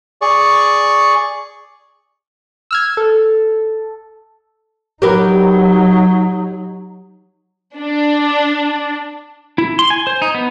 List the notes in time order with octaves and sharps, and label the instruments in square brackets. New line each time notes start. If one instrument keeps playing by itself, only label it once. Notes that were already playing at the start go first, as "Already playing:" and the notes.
[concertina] G#4 D5 C#6
[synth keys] E6 F6 G#6
A4
[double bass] F#3 D#4 [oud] G4 A#4 B4
[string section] D4
[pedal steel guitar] E4
C6
G#5
C5
D#4
B3